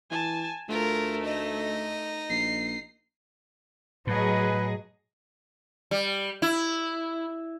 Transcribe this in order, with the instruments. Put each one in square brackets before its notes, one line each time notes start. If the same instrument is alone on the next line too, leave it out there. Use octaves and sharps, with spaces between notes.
[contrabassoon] E3 [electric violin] G#5 A5
[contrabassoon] D2 [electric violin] A3 [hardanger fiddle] F4 A#4
[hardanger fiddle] D#4 D#5
[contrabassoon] A#1 [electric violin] C7
[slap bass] A2 [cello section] F#3 G#4 D#5 [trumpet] B4
[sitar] G3
E4